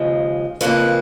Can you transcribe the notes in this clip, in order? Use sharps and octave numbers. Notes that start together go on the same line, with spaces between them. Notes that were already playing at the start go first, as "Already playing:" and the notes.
Already playing: D#2 C#3 F3 G#3
F2 C#3 F3 A#3 B4